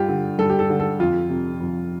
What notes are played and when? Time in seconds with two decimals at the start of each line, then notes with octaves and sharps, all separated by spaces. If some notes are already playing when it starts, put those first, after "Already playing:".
Already playing: G2 F4 G4
0.09 D3
0.39 G2 A4
0.50 G4
0.59 A4
0.70 D3
0.80 A4
0.99 F2 F4
1.30 C3
1.60 F2